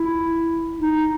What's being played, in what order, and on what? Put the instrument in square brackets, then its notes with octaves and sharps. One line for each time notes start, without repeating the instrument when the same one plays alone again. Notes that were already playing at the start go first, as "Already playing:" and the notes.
Already playing: [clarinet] E4
D#4